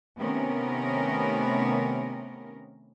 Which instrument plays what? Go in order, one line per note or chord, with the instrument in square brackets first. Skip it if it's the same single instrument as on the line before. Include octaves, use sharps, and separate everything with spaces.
[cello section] C3 D#3 A3 B3 C#4 A#4